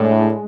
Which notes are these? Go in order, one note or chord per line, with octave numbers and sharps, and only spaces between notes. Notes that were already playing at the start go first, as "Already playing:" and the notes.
Already playing: A2 G#3 D4